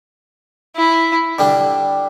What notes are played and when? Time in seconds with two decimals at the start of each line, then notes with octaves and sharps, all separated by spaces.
0.76 E4
1.39 D3 G3 D4